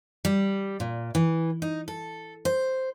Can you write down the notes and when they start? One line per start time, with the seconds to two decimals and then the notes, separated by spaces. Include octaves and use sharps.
0.25 G3
0.80 A#2
1.15 E3
1.62 D#4
1.88 A4
2.45 C5